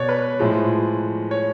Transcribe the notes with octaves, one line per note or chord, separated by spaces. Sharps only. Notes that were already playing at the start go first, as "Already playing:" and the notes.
Already playing: B2 C#5 D5
B4
A2 F3 G#3
C#5